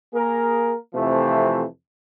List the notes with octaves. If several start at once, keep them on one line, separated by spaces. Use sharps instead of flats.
A#3 G#4 A#4
F2 C3 E3 F3 A3 C5